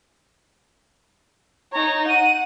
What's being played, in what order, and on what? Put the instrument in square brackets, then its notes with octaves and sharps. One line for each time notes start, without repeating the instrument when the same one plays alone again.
[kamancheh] D#4 C#5 [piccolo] A#5
[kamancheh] F#5 [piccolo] D#7